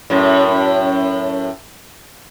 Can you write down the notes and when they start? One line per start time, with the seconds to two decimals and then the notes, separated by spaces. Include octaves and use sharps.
0.10 F#2 A2